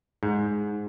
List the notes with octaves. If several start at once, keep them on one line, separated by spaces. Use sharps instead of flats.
G#2